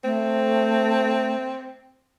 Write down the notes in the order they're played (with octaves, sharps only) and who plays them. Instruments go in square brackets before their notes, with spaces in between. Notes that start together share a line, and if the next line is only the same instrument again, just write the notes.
[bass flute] A3 [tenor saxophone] C4